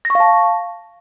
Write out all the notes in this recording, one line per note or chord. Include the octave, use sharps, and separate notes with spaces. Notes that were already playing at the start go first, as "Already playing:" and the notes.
A#6
C#6
F5
A5